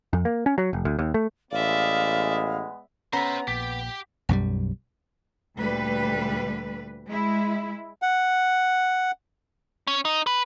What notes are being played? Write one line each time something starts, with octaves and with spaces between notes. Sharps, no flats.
F2
A#3
C#4
F#3
F1
D2
D#2
A3
A1 G#3 B3 D5 E5 F5
B3 C#4 C5 E5 A#5
A#1 G4 B6
B1 F#2 F3 G3
D2 A#2 G3 B4
G#3 E4
F#5
C#4
D#4
B4